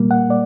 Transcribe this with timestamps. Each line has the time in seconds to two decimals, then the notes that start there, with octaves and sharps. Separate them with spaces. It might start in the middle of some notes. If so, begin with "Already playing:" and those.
Already playing: A#2 G3 A#3
0.11 F#5
0.30 D5